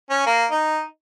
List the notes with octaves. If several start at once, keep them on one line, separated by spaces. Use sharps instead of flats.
C#4
A#3
D#4